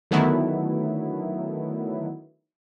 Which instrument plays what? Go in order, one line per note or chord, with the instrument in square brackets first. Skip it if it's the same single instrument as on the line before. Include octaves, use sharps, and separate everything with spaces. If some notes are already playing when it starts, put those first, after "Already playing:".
[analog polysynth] D3 D#3 F#3 A3 B3 E4